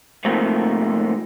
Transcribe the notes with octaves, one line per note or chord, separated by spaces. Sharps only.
G#2 C3 F3 A3 A#3